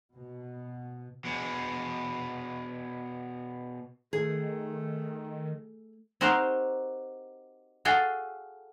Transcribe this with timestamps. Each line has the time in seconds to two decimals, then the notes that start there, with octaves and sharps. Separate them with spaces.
0.13 B2
1.25 B2 G#3
4.13 D#3 A3 G#4
6.21 C4 D#4 F#4 G4 A#4 C5
7.85 F#4 G#4 A4 F5 G5